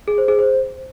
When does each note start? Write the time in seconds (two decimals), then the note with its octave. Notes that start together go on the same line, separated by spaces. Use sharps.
0.08 G#4
0.18 C5
0.28 G#4
0.39 C5